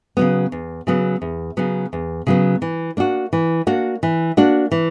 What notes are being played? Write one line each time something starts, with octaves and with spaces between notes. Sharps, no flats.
C#3 F#3 B3
E2
C#3 F#3 B3
E2
C#3 F#3 B3
E2
C#3 F#3 B3
E3
A#3 D4 F#4
E3
A#3 D4 F#4
E3
A#3 D4 F#4
E3